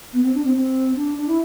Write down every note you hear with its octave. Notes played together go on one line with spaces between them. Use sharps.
B3
C4
D4
C4
C4
D4
D4
E4